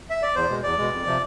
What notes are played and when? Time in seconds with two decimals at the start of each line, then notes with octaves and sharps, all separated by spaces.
0.10 E5
0.22 D5
0.35 E2 C5
0.50 B2 G#3
0.63 E2 D5
0.78 B2 G#3
0.93 F2
1.06 C3 F3